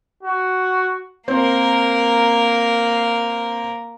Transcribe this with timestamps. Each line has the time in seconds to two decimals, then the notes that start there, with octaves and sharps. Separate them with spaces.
0.23 F#4
1.28 A#3 C4 A#4